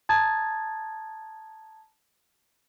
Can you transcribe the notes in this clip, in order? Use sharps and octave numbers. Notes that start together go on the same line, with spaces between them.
A5 A#5 D#6 G#6 A6